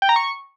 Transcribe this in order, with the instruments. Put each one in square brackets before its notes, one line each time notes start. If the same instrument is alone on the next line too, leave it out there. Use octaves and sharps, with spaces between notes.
[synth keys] G5
A#5
C#6